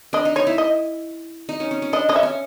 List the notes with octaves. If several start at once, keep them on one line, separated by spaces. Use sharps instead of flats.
D4 D#5
D#4
D#4 C#5
E4
D#5
D#4
C#4
C#4
C#4
D4 D#5
C#4 D#5
E5
C#4